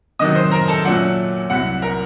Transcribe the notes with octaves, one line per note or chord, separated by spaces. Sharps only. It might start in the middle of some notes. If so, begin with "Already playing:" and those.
C3 D#3 F#3 D#5 D#6
C5 C6
A#4 A#5
A4 A5
A#2 F#3 A3 C#4 F#5
C2 C3 F#3 F#5
A#4 A#5